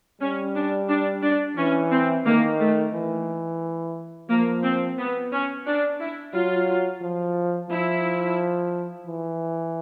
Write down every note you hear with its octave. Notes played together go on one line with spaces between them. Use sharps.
G3 C#4
D4
D4
D4
E3 C#4
C4
D#3 A#3
A3
E3
F3 A#3
C4
B3
C#4
D4
E4
F#3 F4
F3
F3 E4
E3